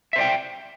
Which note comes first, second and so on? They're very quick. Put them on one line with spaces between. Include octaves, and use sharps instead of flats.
E5 C5 D5 G5